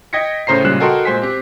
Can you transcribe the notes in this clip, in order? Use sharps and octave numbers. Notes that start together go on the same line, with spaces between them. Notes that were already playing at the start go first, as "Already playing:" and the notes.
D#5 G5 G#6 A#6 B6 C#7
A2 C#3 C5 A#5 C7
A#2 C#3 G3 G#3 F#6 E7
F#4 A4 A#4 D#5 G5 C6
A#2 G#3 C5 G#5 B6
C4 G4